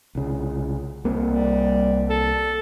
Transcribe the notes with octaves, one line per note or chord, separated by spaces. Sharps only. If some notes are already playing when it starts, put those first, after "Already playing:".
C2 C#3
C2 A#3 C4
G3
A4